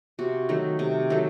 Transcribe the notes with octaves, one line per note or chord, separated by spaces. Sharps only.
C3 F#4
D#3 F#3 A3
C3
D#3 F#3 A3